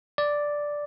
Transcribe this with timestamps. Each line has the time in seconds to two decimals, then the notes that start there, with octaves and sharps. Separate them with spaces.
0.18 D5